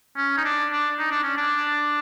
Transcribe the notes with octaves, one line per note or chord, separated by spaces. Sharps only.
C#4
D#4
D4
D4
D#4
D4
C#4
D4